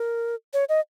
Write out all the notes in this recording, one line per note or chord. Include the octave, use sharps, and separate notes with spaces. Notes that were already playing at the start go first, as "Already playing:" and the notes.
Already playing: A#4
C#5
D#5